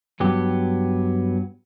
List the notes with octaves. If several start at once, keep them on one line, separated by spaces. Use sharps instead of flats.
G2 F#3 B3 G4